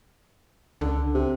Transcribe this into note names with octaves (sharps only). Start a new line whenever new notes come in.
C#2 D3
C3